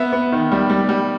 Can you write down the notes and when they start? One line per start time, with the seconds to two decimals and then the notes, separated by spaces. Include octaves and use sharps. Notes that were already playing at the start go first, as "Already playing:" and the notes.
Already playing: B3 E5
0.13 B3
0.32 D#3
0.52 G3
0.70 G3
0.89 G3